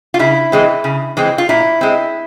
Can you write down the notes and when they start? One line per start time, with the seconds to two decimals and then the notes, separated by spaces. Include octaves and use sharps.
0.14 F4
0.19 C#3 E4
0.52 E3 G#3 C4
0.84 C#3
1.17 E3 G#3 C4
1.38 F4
1.49 A#2 E4
1.81 G#3 C4